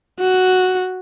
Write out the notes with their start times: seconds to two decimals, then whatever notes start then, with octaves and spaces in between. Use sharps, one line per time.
0.19 F#4